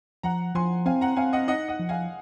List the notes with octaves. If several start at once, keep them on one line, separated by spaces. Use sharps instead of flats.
F3 F#5 A#5
F3 G#5 C6
C4 F5 G#5
F#5 A#5
C4 F5 G#5
D#5 F#5
D#4 D#5 F#5
D#5 F#5
F3
F5 G#5